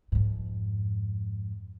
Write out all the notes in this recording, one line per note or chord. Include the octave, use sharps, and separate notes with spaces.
F2 G#2